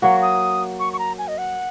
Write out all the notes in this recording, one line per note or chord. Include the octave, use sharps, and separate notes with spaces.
F#3 A#3 F#4 C#6
D#6
C#6
C#6
A#5
G#5
D#5
F#5